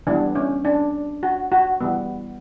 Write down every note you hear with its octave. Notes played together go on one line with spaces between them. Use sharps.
E3 G3 B3 D4
C#4
D4
F#4
F#4
E3 G3 B3